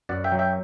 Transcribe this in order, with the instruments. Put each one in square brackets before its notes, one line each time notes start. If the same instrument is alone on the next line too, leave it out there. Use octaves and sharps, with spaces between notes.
[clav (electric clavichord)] F#2 D5 F#5
E5 G5
F#3
E5 G5